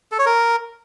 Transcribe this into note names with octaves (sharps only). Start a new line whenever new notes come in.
A4
C#5
A#4